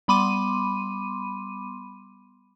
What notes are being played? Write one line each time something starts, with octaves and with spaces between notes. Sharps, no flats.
G3 B3 B5 C6 D6 D#7